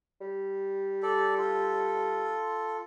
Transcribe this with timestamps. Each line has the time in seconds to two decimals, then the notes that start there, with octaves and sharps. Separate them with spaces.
0.21 G3
1.03 A4 D5
1.38 F4 A4